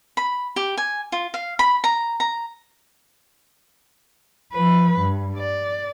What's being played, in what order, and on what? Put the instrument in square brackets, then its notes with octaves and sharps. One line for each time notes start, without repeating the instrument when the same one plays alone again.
[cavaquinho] B5
G4
G#5
F4
F5
B5
A#5
A#5
[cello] F3 B4
G2
D5